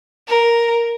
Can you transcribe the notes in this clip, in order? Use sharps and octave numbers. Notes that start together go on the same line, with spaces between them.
A#4